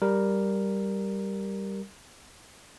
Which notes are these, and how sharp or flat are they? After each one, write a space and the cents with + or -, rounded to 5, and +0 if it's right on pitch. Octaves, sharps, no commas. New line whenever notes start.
G3 +0 A#4 +0